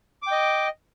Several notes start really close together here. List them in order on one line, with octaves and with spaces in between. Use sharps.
D6 G5 D#5